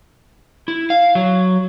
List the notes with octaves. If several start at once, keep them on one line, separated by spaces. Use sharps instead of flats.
E4
F5
F#3